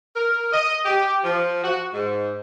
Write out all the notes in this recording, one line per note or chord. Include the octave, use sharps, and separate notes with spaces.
A#4
D#5
G4
F3
F#4
G#2